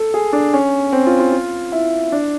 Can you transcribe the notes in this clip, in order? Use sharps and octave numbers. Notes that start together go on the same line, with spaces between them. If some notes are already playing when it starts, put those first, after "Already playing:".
Already playing: A4
G#4
D4
C#4
C4
F4
F4
F4
E4
D4